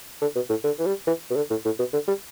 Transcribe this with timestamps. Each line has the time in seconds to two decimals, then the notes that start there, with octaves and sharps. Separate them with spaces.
0.21 D3
0.35 B2
0.49 A2
0.64 D3
0.79 E3
0.86 G3
1.07 E3
1.30 B2
1.36 D3
1.50 A2
1.65 A2
1.79 B2
1.93 D3
2.08 G3